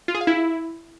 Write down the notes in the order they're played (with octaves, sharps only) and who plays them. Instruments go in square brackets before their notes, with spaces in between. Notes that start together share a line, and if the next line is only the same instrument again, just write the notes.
[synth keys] F4
G#4
F5
E4